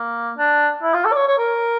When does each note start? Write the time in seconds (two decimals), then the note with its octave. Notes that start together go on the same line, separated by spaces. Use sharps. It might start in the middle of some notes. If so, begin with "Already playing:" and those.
Already playing: A#3
0.38 D4
0.83 E4
0.94 F4
1.05 A4
1.12 D5
1.16 C#5
1.27 C#5
1.38 A#4